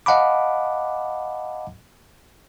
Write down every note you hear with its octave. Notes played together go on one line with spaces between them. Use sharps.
D#5 F5 F#5 A5 B5 D6